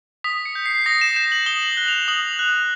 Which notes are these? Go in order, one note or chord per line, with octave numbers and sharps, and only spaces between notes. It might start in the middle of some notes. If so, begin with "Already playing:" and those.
D#6 B6
C#7
G6
C7
D#6 A#6
E7
G6 E7
F#7
D#6 G7
F#7
F#6 G7
F7
F#7
D#6 F#7
F#6